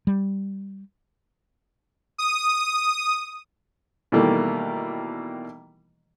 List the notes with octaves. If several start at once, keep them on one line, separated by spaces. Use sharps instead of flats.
G3
D#6
B2 D#3 E3 G3 A3 A#3